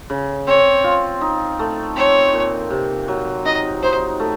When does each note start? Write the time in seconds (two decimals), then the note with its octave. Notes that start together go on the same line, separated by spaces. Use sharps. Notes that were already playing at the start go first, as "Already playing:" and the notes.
0.10 C#3
0.47 C4 C#5
0.84 F4
1.21 D#4
1.59 A3
1.96 C4 C#5
2.33 A#2
2.71 C3
3.08 F#3
3.46 D#4 D#5
3.83 D#4 C5
4.20 A3